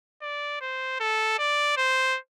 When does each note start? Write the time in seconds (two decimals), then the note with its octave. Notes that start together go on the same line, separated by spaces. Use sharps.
0.22 D5
0.61 C5
1.00 A4
1.39 D5
1.77 C5